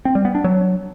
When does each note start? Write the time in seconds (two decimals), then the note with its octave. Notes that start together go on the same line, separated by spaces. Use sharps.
0.05 C4
0.15 G3
0.25 B3
0.35 D4
0.44 F#3